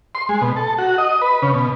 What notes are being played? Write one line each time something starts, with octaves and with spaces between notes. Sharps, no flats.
C6
G#3
B2
A4
F#4
D#5
B4
C#3
B2